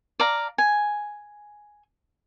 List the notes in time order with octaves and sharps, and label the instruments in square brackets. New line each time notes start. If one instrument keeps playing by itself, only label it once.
[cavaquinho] D5 F5 A#5
G#5